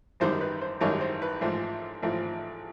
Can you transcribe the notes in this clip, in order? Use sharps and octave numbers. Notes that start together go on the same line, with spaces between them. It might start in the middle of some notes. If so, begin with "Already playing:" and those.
G#1 F#2 D#3 G3 C5
B4
C5
G#1 F#2 D#3 G3 C#5
C5
B4
A1 G#2 F3
A1 G#2 F3